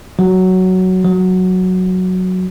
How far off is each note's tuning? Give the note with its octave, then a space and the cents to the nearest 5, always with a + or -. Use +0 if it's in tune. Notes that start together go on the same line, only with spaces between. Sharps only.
F#3 +5
F#3 -5